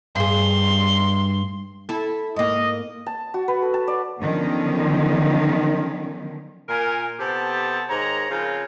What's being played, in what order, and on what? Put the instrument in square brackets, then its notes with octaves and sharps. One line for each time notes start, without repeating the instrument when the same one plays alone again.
[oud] G2 G#4 [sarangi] C6
[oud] E4 A4
[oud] G#2 A#3 [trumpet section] D#5
[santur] A5
F#4
B4
A4
A5
D5
[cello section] D3 D#3 F3 F#3 B3 C#4
[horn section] A#2 A#4 G#5
C3 B3 G4 A4 A5
G#2 D#3 C#5 A#5
C#3 F3 C4 F4 G#4 A#4